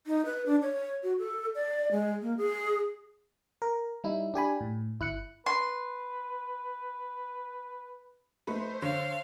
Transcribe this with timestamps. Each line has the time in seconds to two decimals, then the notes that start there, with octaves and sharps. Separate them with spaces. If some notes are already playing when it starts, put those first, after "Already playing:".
0.07 D#4
0.25 B4
0.46 D4
0.62 C#5
1.03 F#4
1.19 A4
1.55 D5
1.91 G#3
2.22 A#3
2.37 G#4
3.62 A#4
4.04 G3 D#4 E4
4.34 D4 G4 G#5 B5
4.61 A2
5.00 G1 E4 F#6 C#7
5.46 B4 C6
8.47 A3 D#4 B4 C5
8.82 D3 C#5 F5